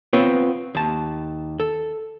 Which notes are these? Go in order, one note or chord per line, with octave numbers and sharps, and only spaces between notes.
B3 C4 F4 B4 C#5
D#2 A5
A4